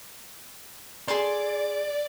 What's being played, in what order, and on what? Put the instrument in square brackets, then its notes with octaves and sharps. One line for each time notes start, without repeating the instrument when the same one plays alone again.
[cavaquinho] G#4 A4 C6 [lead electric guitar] D5